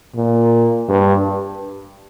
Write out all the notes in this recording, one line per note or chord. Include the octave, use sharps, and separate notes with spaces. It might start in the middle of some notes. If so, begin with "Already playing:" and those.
A#2
G2